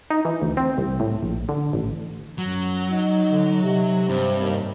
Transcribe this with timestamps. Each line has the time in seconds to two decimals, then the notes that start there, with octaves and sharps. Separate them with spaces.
0.10 D#4
0.25 E3
0.42 D2
0.57 C4
0.78 C2
1.00 A2
1.23 A#1
1.49 D3
1.73 A1
2.38 F#2 F#3
2.91 D#4
3.30 D3
3.62 C3
4.09 G2 C4
4.40 D#2